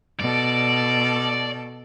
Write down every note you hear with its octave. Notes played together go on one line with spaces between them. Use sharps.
B2 A4 D5